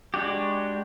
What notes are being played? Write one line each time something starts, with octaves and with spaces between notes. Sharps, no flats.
G#3 D4 F#4 G4